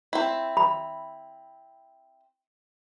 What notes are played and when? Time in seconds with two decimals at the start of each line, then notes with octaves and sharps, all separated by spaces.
0.13 C4 E4
0.57 B5